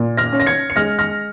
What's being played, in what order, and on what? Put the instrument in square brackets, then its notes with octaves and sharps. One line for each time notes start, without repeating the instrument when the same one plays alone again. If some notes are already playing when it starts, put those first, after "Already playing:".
Already playing: [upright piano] A#2
F6 A#6
C#4
A#6
G#6 C#7
C#7
G#3 F6 A#6
F6 A#6